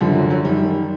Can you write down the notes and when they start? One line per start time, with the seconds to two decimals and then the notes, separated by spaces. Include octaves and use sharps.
0.01 F#2 D3 F3 G3
0.16 F#3
0.30 F#3
0.45 F#2 D#3 G3